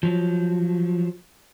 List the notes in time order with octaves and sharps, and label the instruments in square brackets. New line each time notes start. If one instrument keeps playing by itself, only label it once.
[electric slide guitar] F3 F#3